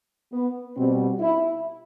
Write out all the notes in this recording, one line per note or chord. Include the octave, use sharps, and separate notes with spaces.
B3
B2 G3 C4
E4